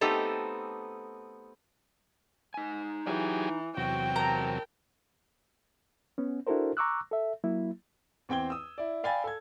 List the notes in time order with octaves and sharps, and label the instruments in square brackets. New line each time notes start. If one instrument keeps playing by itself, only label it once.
[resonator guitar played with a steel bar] A3 B3 C4 D#4 G4 A4
[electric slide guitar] D#4 G#5
[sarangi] E3 [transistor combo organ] F#3 G4 G#4
[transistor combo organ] E2 C3 F#3 [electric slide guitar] F#4 [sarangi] G5
[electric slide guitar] A#4 A5 [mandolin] A#5
[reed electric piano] B3 C#4
D4 E4 F#4 A4 A#4 C5
A#5 C#6 D6 E6 F#6
A4 E5
F#3 A#3 E4
[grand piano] E2 C4 G5 G#6 G7
D#6 E6
E4 D5
D5 F5 G5 G#5 B5 A6
A4 G#6